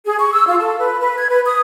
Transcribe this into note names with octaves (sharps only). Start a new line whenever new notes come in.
G#4
C#6
E6
F4
A4
B4
B4
G#6
B4
D#6